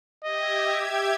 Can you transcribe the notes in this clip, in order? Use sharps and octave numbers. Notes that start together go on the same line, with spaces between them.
G4 D#5 E5 G#6